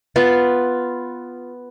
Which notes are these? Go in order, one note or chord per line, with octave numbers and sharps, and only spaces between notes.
B3 F4